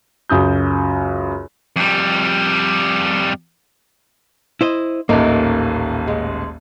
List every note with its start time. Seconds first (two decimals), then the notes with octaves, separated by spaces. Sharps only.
0.29 C#2 F#2 D#6 G6
1.76 F2 G3
4.61 E4 C5 D#5
5.09 D#1 A1 A3 A#3 D#4 A#4
6.07 G#3